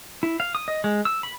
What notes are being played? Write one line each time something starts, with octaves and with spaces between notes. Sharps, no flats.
E4
F5
D#6
D#5
G#3
E6
B5